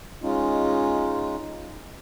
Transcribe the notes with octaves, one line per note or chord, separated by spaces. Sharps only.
G#3 C#4 D#4 F4